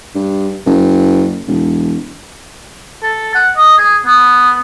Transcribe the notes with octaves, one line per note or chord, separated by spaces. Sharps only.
G2
F#1
E1
A4
F#5
D#5
G#4
B3